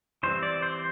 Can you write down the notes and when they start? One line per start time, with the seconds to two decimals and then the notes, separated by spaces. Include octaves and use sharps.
0.23 E3 G3 C4 C5
0.43 D5
0.62 C5